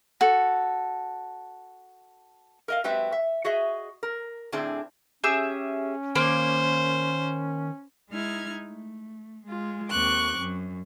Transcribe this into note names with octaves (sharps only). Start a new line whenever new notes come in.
F#4 A4
A#4 D#5 F5
F#3 G#3 C4 G4 B4 E5
E5
F#4 G#4 D#5 E5
A#4
A2 D3 C4 D4 E4 G#4
C#4 G4 G#4 E5
D#3 A#3 C5
G#3 D#4 E4 F6 G#6
A3
G#3 F4
D#2 C4 C#6 D6 F#6
F#2